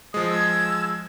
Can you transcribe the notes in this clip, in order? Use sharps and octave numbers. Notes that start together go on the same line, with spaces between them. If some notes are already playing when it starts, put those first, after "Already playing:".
F3 G#3 D#6
E6 G#6